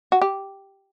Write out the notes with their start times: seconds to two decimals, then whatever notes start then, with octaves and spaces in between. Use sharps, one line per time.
0.12 F#4
0.22 G4